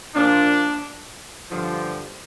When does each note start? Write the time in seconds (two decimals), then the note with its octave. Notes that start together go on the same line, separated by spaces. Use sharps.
0.15 A#2 F3 D4
1.50 G2 D3 F3